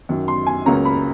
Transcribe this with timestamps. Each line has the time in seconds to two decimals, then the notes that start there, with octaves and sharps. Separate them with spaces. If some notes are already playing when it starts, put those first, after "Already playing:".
0.09 F#2 D#3 F#3
0.28 C6
0.47 G#5
0.66 C#2 C#3 F#3 A#3 C#4 A#5
0.85 B5